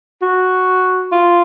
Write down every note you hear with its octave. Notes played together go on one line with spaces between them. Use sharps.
F#4
F4